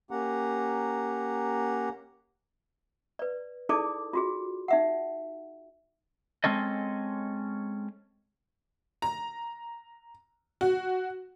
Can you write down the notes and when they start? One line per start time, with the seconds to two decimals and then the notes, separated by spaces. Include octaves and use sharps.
0.11 A#3 C#4 G4 F#5 A#5
3.19 B4 D5
3.69 D#4 E4 G#4 A4 D5 D6
4.13 F4 F#4 G#4
4.68 D#4 E5 F#5
6.44 G#3 C4 C#4 A4 D#5
9.02 A#5
10.61 F#4